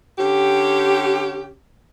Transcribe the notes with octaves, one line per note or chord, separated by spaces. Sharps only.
D3 C#4 G4